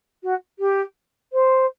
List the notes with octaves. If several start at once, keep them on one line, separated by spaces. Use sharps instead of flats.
F#4
G4
C5